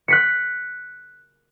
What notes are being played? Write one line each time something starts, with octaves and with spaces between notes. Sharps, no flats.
F#6 B6 C#7